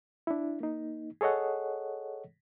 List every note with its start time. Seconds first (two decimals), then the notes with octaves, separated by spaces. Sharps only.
0.27 D4 E4
0.60 A#3 D#4
1.21 G#4 A4 C#5 D#5 F#5